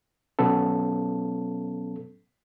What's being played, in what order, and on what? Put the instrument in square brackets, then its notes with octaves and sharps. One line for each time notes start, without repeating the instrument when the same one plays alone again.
[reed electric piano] B2 F#3 B3 C#4 A4